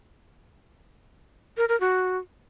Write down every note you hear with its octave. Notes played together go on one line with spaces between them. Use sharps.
A#4
A#4
F#4